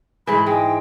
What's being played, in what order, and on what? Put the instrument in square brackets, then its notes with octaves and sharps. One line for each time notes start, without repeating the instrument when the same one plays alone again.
[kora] G#2 E3 [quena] B5
[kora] G#3 [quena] G5